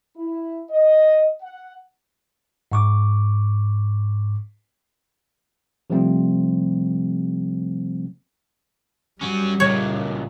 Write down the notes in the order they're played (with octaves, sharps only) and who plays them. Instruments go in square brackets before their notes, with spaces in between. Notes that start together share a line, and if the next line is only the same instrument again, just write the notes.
[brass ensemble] E4
D#5
F#5
[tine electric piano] G#2 C#6 D6
C3 F3 G3 A3 C4
[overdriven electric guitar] F#3 C#4 [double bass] G3
[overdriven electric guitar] C#2 A#2 [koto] C#5